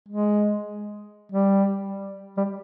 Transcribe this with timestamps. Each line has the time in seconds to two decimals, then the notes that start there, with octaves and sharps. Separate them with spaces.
0.09 G#3
1.32 G3
2.37 G3